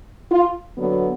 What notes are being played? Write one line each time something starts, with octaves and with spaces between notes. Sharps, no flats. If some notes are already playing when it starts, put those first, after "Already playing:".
F4
D3 F#3 B3